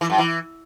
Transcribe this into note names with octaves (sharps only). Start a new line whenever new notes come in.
E3
F#2
E3